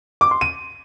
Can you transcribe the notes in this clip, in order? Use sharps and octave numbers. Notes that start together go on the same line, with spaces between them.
D6
C6
D#7